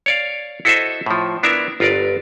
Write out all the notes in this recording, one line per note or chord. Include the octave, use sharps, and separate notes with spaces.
C#5 D5 F5
E4 F#4 A4 C5 D#5 E5
A2 F3
B3 D4 E4 A#4 E5
G1 F4 A#4 B4 D5